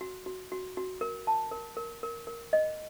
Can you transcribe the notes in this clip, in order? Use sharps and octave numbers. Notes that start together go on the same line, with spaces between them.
F#4
F#4
F#4
F#4
A#4
A5
A#4
A#4
A#4
A#4
D#5